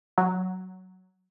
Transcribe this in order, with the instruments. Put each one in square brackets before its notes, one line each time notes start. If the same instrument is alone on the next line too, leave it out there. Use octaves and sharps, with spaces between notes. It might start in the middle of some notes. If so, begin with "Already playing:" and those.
[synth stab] F#3